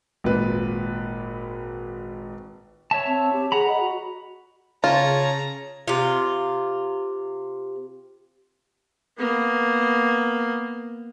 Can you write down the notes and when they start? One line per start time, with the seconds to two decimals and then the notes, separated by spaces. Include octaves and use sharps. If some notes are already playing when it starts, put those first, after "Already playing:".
0.24 G#1 A#2 B4
2.91 C#5 E5 A5
3.07 C4
3.33 G4
3.52 G#4 F#5 A#5 B5
3.68 D#5
3.80 F#4
4.84 C#3 F4 C#5 A5 A#5
5.88 C3 F4
9.19 A#3 B3